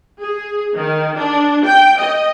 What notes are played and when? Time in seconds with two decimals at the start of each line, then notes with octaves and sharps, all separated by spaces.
0.22 G#4
0.76 D#3
1.17 D4
1.65 G5
1.99 D#5